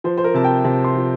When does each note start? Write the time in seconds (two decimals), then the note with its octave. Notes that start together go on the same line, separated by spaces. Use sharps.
0.04 F3 C5
0.18 C5
0.24 A#4
0.34 C3 A5
0.44 G5
0.64 C3 A5
0.84 C6
0.96 F3